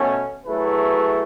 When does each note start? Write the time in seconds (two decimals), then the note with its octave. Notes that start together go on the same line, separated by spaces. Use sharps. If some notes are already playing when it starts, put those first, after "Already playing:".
Already playing: B2 A3 C#4
0.45 F#3 A3 E4 G#4 B4